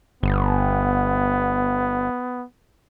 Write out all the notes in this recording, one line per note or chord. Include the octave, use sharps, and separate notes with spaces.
G1 B3